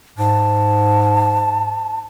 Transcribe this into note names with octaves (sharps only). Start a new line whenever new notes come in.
G#2 A5